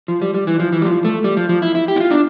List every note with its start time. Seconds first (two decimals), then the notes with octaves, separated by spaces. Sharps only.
0.08 F3
0.22 G3
0.34 G3
0.47 E3
0.60 F3
0.73 E3
0.82 G3
0.85 F3
1.05 A3
1.24 G3
1.37 F3
1.49 F3
1.62 E4
1.75 E4
1.88 G4
1.96 E4
2.00 F4
2.11 D4